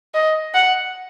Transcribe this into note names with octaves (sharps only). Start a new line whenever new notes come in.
D#5
F#5